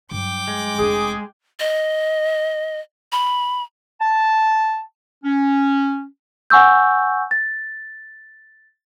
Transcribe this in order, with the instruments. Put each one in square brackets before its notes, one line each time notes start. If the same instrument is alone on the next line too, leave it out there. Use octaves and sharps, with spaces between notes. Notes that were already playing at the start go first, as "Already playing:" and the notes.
[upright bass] G2 F#3 [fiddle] G5 D6
[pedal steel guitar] G#3
[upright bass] F1 D4 [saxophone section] G#4
[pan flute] D#5
B5
[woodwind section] A5
C#4
[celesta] F#5 G#5 C#6 E6 G6
A6